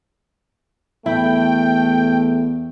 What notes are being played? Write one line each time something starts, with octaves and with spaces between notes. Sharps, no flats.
E2 A3 E4 G5